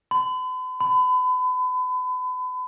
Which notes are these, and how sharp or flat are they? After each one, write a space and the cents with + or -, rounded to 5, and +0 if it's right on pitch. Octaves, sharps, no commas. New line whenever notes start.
B5 +45
B5 +35